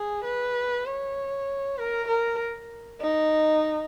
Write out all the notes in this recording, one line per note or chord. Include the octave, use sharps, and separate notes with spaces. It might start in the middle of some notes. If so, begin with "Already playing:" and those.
Already playing: G#4
B4
C#5
A#4
A#4
D#4